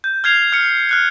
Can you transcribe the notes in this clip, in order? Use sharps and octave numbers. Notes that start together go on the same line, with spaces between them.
G6
F6 G#6 C7 F7
F6 C#7
F6 F#6 C#7